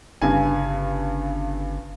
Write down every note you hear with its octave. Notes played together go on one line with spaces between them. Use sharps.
G1 G2 C#3 G#5